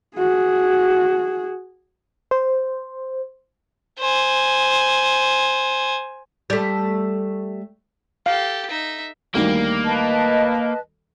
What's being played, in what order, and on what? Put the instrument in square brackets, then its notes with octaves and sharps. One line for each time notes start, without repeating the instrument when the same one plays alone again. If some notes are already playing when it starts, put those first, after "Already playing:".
[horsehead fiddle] F#4 G#4
[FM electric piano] C5
[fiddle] C5 G#5
[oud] G3 A3
[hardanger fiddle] G4 A4 [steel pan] F5
[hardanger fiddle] D#4 E5
[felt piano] D2 D#3 G3 [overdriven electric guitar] A#3
[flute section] B4 D#5 A5